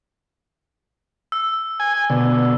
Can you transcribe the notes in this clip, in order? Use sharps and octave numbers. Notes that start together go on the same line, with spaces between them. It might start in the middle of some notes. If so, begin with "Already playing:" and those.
E6
G#5
B2 D3